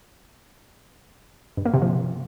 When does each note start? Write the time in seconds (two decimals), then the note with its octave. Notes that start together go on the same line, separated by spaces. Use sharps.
1.57 G2
1.65 A#3
1.74 C3
1.82 F3